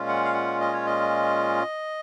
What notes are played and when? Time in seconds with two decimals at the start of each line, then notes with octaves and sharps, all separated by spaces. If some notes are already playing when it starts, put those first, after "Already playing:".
Already playing: A#2 G#3 C#4 F4
0.08 F#5
0.24 F5
0.34 F#5
0.60 D#5
0.73 C#5
0.86 D#5